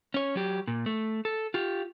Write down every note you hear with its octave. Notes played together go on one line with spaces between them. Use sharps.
C#4 C#5
F#3 G4
A#2
A3
A4
F4 G4